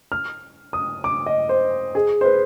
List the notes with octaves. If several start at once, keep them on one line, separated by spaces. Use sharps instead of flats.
F6
D#6
D6
D#5
C5
G#4
C5
B4